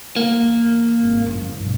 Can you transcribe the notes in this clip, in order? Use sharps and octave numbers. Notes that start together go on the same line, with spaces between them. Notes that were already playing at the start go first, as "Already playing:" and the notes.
A#3
E2
G#1
F#1 F3
G2 B2